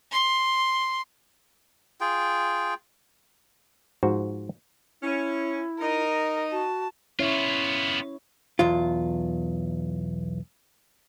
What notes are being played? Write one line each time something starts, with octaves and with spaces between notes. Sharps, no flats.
C6
F4 G#4 G5
G#2 F3 F#4 C5
C#4 E4
D#4 A#4 D#5
F#4 A5
B3 C#4 E4 F4 C#5
B1 E2 F4